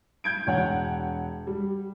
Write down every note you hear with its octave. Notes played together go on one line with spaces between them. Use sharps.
G6 G#6 D7
E1 C#5 F#5
G3